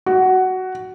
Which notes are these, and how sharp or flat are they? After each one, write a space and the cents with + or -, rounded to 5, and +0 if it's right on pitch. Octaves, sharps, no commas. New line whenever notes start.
F#4 +10